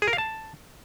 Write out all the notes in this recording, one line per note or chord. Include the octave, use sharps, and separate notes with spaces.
G#4
A#4
F5
A5